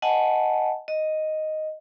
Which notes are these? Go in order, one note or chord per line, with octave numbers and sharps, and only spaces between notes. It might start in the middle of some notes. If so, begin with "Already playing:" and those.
D#5 F#5 G#5 A5
D#5